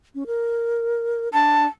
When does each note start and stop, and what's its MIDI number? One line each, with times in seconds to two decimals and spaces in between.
0.15 0.24 61
0.27 1.29 70
1.33 1.66 62
1.33 1.65 81